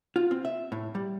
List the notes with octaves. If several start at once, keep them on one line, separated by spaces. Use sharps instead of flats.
F4
C4
E5
A2
G3